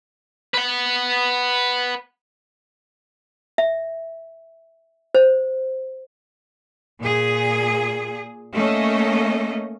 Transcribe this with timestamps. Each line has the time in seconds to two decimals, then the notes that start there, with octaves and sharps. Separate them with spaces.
0.54 B4 F#5
3.58 E5
5.15 C5
6.99 A#2 G#4
8.54 A3 A#3 C#4 D#5